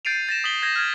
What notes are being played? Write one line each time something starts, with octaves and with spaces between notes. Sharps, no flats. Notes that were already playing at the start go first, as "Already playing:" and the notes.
G6 A6 C7 D7 D#7 F7
A6 A#6 E7
D#6 A6 B6 F#7 G7
G6 G#6 A#6
F6 G#6